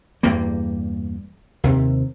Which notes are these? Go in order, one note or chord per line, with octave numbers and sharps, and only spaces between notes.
E2 G2 G3 A#3
D#2 C3